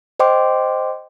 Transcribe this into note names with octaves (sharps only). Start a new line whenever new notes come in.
C5 D#5 G5 C6 D6